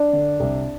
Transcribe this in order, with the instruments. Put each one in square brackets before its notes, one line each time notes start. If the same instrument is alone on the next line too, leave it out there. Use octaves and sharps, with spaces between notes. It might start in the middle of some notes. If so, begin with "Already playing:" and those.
Already playing: [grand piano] D4
D3
C2